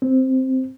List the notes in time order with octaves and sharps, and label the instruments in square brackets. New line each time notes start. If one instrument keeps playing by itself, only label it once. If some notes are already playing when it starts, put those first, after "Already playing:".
[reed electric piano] C4